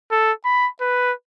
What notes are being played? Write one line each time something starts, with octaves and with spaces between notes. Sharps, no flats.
A4
B5
B4